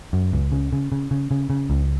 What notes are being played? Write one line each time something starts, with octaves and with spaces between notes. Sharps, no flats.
F#2
C#2
C#3
C#3
C#3
C#3
C#3
C#3
C#2